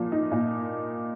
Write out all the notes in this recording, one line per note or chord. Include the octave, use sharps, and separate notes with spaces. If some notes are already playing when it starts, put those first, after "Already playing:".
Already playing: A#2 F3 A#3
D#4
A#2